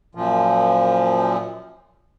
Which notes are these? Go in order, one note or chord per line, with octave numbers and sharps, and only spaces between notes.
F#2 A#2 F3